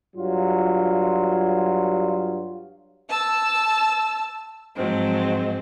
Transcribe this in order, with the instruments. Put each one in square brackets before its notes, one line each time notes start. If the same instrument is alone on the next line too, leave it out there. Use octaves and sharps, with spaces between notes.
[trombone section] G2 F#3 F4
[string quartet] A5 E6
G#2 F3 F#3 G#3 C4